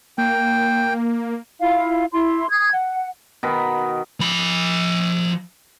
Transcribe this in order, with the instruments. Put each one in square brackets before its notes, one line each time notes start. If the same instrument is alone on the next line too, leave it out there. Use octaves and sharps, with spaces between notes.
[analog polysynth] A#3 [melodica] G5
[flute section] E4 F4 F5
E4 C6
D#6 G#6
F#5
[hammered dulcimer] B2 D#3 D#5 B5
[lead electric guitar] F3 B5